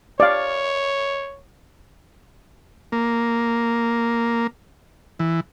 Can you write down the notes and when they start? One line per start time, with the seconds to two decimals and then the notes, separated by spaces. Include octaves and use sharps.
0.20 C#5 D5 F5
2.92 A#3
5.19 E3